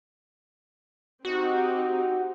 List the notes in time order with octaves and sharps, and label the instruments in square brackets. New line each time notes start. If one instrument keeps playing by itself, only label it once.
[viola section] C4 D#4 G4 [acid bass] F#4